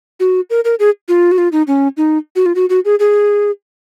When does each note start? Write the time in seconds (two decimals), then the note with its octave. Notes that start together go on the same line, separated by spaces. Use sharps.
0.20 F#4
0.50 A#4
0.65 A#4
0.79 G#4
1.08 F4
1.32 F#4
1.38 F4
1.52 D#4
1.67 C#4
1.97 D#4
2.36 F#4
2.46 F4
2.55 F#4
2.69 F#4
2.85 G#4
2.99 G#4